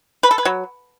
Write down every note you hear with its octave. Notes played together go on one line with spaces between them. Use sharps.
B4
A4
B4
F#3